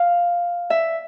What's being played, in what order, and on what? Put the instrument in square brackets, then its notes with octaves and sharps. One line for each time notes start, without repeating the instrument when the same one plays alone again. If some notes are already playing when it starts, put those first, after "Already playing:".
Already playing: [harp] F5
E5